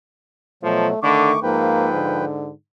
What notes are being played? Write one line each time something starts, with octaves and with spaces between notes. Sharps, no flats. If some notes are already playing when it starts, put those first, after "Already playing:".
B2 F3 F#3 A3
D3 D#3 A3 C#6 D6
G#2 F3 A#3 B4 G5
D3